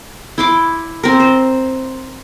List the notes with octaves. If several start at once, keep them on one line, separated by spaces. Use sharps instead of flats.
E4 C6 D6
C4 A#4
C5